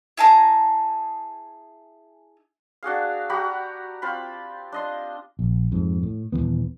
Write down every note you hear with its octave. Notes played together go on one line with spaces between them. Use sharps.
E4 G#4 A5 A#5
D4 F#4 G#4 F5
F#4 G4 A#5 B5
C4 F4 B5
D4 D#5 C6
A#1
F2 G#2
A2
D#1 F#2 E3 B3